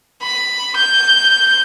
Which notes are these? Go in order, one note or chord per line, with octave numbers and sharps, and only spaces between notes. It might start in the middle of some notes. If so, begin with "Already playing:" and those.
B5
G6